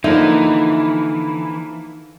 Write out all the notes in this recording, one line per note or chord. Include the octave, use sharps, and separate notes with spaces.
D3 E3 F3 A#3 D#4 E4